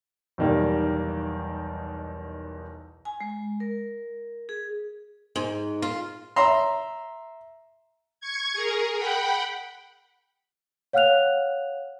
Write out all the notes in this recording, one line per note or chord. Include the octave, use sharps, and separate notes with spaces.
B1 E2 D#3 G3 A#3
G#5
G#3
A#4
G#4
G#2
F4
E5 A#5 C6
C#6 G#6
G#4 A#4
F#5 G5 B5
C#5 F5 F#5 F6 F#6 F7